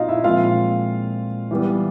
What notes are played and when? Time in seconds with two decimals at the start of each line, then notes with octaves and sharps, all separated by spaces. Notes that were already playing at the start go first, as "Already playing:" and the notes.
Already playing: A#2 A3 C4 D#4 F4 F#4 D#5 F5
0.09 E4 E5
0.24 A#2 F3 G#3 C4 F4 F5
1.51 E3 G3 B3